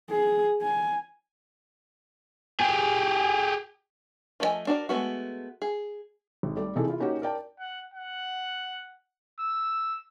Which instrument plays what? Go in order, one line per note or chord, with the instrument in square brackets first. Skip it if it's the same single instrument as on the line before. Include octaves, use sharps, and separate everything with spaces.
[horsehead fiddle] G#4
G#5
[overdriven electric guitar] G4 G#4
[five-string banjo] F3 A3 F#4 D#5 G#5
D4 F#4 A#4 D5
G#3 A3 B3 F#4
G#4
[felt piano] G#1
G3 A3 D5
C3 D#3 E3 D#4 G#4 A4
E4 F4
A#3 C#4 D#4 F#4 G4
A#4 D5 G5 A5
[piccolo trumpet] F#5
F#5
E6